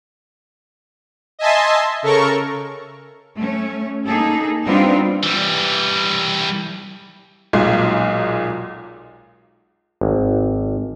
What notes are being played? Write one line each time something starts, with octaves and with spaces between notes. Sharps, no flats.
D#5 E5 G#5 A5 C6
C#3 A4 A#4 C#6
A3 C#4
A#3 D#4 G#4 A4
G3 B3 C4 D4 D#4 F4
E3 G3
B1 A#2 G#3
G#1